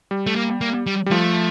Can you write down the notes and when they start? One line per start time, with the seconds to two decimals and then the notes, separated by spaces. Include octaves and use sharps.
0.11 G3
0.27 A3
0.36 A#3
0.61 A#3
0.86 G3
1.06 G3
1.11 F3 A3